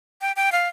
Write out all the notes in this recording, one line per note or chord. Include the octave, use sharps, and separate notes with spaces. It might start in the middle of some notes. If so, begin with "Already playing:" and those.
G5
G5
F5